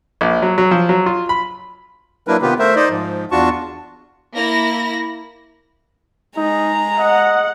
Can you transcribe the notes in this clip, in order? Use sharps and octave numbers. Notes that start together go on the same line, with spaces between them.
A#1
F#3
F#3
F3
F#3
F4
B5
F#3 A#3 D4 E4 A#4 B4
C3 D#3 B3 F4 G4 B4
A3 A#4 C5 E5
D#4 C5 D5 D#5
G#2 F3
E2 D4 F4 F#4 A5 C#6
A#3 E4 A#6
G#3 D#4 A#5
D#5 F#5